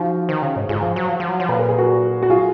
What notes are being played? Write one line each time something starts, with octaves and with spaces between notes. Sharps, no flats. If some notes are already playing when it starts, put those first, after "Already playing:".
Already playing: F3 D#4 F#4
D#3
C#3
G#2
G#2 F4 G#4
F3
F#3
F3
F3
F#3
F3
A#2 B4
A#4
G#4
F#4 A#4
F#4
F4 G#4